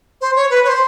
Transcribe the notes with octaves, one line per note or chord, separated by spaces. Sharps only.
C5
C#5
B4
C#5
C5